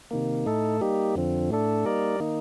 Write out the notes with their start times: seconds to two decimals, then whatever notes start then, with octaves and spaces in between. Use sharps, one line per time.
0.11 C3 D#3 A#3
0.46 A2 A3 D#4 A4
0.81 G3 A#3 D#4 G4
1.15 F2 D3 F3 C4
1.50 A2 A3 D4 A4
1.85 G3 A#3 D#4 A#4 D5
2.20 D#3 A#3 D#4